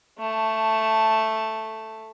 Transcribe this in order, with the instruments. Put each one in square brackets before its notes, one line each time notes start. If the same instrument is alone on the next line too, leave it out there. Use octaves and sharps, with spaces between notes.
[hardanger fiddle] A3 A5